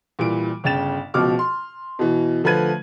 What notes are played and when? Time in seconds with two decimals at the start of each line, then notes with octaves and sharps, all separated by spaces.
0.19 A#2 E3 G3 D7
0.64 G1 C#3 G5 A6 E7
1.14 C#2 B2 F3 D6 F6
1.39 C6
1.99 B2 E3
2.44 D3 F3 A3 B4 G#6 D#7